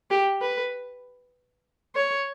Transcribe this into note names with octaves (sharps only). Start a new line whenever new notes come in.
G4
B4
C#5